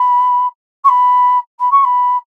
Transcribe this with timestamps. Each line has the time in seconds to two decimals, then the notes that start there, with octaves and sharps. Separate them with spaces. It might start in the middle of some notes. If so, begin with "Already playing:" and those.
Already playing: B5
0.84 C#6
0.88 B5
1.59 B5
1.71 C#6
1.84 B5